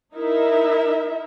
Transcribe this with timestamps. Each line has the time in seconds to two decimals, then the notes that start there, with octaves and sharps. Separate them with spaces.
0.14 D#4 E4 A#4 E5